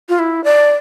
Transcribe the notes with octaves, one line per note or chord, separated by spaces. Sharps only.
F4
E4
D5